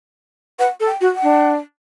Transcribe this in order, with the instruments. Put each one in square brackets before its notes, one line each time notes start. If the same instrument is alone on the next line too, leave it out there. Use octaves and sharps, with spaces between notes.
[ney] B4 [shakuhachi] F#5
[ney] A4
[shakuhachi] G5
[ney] F#4
[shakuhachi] F#5
[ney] D4